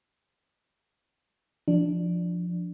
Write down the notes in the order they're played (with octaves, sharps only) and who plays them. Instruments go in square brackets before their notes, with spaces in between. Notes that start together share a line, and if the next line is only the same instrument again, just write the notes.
[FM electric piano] F3 D4